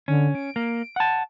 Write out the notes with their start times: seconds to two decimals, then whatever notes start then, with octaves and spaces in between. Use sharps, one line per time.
0.08 D3 C#4
0.35 D7
0.56 A#3
0.96 F#5 A5